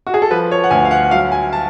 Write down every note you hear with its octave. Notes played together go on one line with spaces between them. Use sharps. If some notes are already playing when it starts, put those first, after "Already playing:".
F#4
G#4
A4
F3 B4
C#5
F#5
D2 G#5
F5
F#5
F#3 F5
G#5
A5